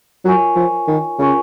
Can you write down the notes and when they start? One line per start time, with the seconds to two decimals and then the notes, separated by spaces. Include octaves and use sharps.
0.25 F#3 F4 A#4 C#5 G#5 C#6
0.56 F3
0.87 D#3
1.18 C#3 F4 A#4 C#5 G#5 C#6